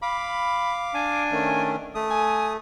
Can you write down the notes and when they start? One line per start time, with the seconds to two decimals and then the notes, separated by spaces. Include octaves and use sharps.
0.02 F5 B5 D6
0.94 D4 G#5
1.31 D#3 A3 C#4
1.95 A3 D#6
2.10 G#5